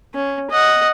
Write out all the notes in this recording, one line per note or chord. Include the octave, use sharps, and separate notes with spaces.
C#4
D#5 F#5